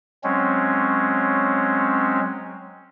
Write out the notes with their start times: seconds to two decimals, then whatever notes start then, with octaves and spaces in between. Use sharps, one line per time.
0.24 F#3 G#3 C4 C#4